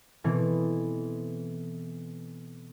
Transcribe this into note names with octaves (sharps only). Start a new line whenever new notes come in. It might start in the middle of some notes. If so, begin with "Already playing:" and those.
B2 E3 C4 A4